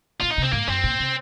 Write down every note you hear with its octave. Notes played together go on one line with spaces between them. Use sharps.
A#2 F4
D#4
C3
C4
G#2 A#3
F#2 C4
A#2
C3